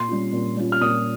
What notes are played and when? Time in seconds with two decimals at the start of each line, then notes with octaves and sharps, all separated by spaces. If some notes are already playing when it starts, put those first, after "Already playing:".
Already playing: A#2 C6
0.08 G3 C#4 F4
0.33 A#2
0.57 G3 C#4 F4
0.72 F6
0.81 A#2 D#6